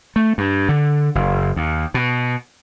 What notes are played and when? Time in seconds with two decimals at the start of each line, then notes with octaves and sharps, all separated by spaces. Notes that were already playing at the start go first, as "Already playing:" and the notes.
0.16 A3
0.38 G2
0.69 D3
1.15 F#1
1.56 D#2
1.94 B2